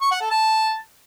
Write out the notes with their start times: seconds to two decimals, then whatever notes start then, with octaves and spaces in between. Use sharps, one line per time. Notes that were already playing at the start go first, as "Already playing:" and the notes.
0.01 C#6
0.11 F#5
0.21 A4
0.31 A5